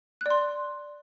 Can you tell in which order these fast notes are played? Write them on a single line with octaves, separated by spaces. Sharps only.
F#6 D5 C6